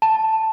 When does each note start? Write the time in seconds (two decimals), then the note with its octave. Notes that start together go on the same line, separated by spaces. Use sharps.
0.02 A5